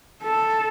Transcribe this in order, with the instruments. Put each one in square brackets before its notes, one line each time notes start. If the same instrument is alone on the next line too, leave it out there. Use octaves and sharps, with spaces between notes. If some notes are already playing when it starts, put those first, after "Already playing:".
[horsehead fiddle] A4